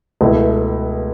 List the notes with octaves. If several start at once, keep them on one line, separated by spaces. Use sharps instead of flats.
C#2 B2 A3 E4